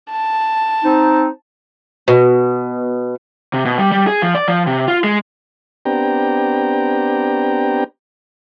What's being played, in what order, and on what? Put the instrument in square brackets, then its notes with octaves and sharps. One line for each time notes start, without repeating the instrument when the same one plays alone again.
[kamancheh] A5
[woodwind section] C4 D#4
[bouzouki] B2
[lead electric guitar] C3
B2
G3
G3
G#4
F3
D5
F3
C3
F4
G#3
[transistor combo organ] B3 C4 D4 G4 G5 A#5